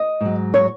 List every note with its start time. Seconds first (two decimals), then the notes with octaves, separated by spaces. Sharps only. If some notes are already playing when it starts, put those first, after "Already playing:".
Already playing: D#5
0.21 G#2 F#3
0.54 C#5